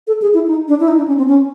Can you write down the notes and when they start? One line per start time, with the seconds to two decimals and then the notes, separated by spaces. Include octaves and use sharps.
0.07 A4
0.22 G#4
0.34 E4
0.48 D#4
0.68 D4
0.80 E4
0.88 D#4
0.97 D4
1.08 C#4
1.17 C4
1.28 C#4